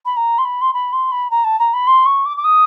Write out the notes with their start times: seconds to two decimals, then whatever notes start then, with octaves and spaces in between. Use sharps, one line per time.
0.06 B5
0.17 A#5
0.38 C6
0.45 B5
0.62 C6
0.74 B5
0.93 C6
1.12 B5
1.31 A#5
1.44 A5
1.59 A#5
1.73 B5
1.87 C6
2.06 C#6
2.26 D6
2.37 D6
2.44 D#6